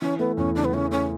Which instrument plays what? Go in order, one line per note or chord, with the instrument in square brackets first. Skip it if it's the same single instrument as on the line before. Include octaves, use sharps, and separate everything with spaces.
[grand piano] E3 [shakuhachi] C#4
[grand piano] A3 [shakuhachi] B3
[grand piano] E2 [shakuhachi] C#4
[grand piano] C#3 [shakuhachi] D4
[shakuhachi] B3
[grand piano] E3 [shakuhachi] C#4
[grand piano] A3 [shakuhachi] C#4